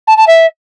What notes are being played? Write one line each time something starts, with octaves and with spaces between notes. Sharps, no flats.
A5
A5
E5